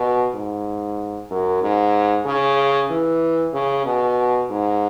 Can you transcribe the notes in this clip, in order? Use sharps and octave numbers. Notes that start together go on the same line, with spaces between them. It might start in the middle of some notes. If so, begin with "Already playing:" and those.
Already playing: B2
G#2
F#2
G#2
C#3
E3
C#3
B2
G#2